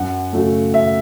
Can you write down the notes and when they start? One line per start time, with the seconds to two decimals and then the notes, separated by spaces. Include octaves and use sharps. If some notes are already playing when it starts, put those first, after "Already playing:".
Already playing: F#2 F#5
0.33 C#3 F#3 A3
0.74 F#2 E5